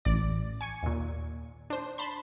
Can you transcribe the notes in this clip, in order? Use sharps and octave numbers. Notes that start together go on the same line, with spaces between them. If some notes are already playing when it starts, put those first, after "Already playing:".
A1 D5
G#5 C#6
D#2 A#2
D4 C5
A5 B5 C6